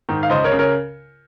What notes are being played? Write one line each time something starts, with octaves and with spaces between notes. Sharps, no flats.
G#2 D#3
F5
C#2 C5 D#5
A#4 C#5
C#3
A#4 C#5